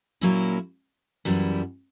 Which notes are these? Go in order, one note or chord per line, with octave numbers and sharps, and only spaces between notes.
A#2 F#3 A#3 C#4 E4
F#2 E3 G3 B3 E4